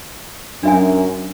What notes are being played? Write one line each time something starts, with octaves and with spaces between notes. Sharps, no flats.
F#2 D4 E5 G#5